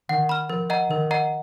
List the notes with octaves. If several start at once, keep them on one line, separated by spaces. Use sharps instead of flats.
D#3 F#5
B5 F6
F3 A#4
D#5 F#5 A#5
D#3 A#4
D#5 F#5 A#5